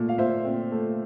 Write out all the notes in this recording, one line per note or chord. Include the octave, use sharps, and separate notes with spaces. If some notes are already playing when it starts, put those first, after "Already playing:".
Already playing: A#2 A3
F5
A#2 C5 E5
C4
A3